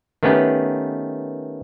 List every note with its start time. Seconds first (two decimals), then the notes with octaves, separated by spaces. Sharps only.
0.23 D#3 A3 B3 C#4 G4 B4